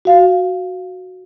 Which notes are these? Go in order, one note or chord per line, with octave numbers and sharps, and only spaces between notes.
F#4 F5